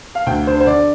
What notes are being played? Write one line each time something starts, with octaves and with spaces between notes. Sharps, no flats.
F5
D2 G5
D3 C5
C5
D3 D5